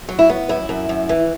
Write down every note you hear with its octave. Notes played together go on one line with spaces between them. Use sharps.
F#3
E4
B3
F#2 E4
F#2
F#2
E3